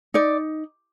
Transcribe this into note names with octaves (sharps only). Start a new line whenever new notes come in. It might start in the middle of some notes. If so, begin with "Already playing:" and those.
D#4 D5